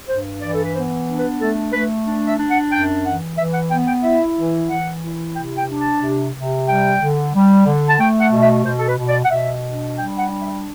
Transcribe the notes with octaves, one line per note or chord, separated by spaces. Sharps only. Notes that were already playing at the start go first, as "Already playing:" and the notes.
G2 C5
E3 D5
A4
B4
B3 C5
D4
B4
A3 A4
A3 B4
D4
E5
D4
F#5
F#2 G5
E3 F#5
E3 E5
F#5
B3 G5
G5
E4 E5
E3
E3 F#5
E4
C3 G5
G5
D4
A5
C3
C3
G3 G5
D3
G3
D3
A5
A3 G5
F#5
B2
E5
B2 C5
A4
B4
B2
D5
F#5
B2 E5
D4
G3 G5
F#5
D4
E5